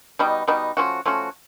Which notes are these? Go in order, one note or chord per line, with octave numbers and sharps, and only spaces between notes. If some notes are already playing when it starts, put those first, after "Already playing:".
B2 G3 B3 D#4
B2 G3 B3 D#4
F3 A3 C#4 F#4
F3 A3 C#4 F#4